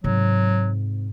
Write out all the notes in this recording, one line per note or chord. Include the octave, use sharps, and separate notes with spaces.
G#2 C3 F#3